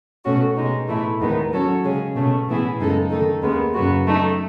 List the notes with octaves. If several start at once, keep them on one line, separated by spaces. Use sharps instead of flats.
B2 A3 C#4 F#4
B2 G#3 D#4
A2 E3 A3 E4
D#2 D#3 G#3 B3 D#4
F#3 C#4 F#4 A4 C#5
C#3 G#3 C#4 G#4
B2 A3 C#4
A2 E3 B3 E4 G#4
F#2 C#3 G#3 D#4 A4
D#3 A3 D#4 A4
D#2 C#3 G#3 B3
F#2 C#3 F#3 B3 F#4
F#3 A3 D#4